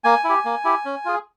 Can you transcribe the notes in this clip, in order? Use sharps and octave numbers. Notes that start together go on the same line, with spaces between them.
A#3 G#5
E4 G4
A#3
E4 G4
C#4
F4 G#4